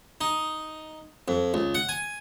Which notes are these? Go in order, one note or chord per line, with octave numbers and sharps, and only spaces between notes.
D#4
F2
C#2
F#5
G#5